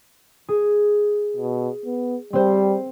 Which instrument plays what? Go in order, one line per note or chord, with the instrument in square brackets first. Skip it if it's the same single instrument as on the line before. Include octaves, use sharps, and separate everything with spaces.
[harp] G#4
[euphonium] B2
B3
[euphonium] G3 [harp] C4 C5